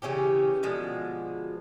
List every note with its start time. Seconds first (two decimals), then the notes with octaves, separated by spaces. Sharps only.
0.02 C#3 E3 C#4 G4
0.63 B2 D3 F3 G#3